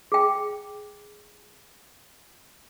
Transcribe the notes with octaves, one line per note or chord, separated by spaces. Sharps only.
G#4 G5